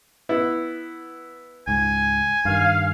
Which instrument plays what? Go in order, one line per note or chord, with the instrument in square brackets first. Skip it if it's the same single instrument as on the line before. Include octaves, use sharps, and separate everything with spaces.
[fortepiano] B3 E4
[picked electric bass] C#2 G#2 [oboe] G#5
[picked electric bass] G2 D#3 [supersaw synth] F5